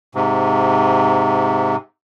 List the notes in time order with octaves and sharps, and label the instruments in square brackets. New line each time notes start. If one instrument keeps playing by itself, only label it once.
[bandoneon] G#2 C3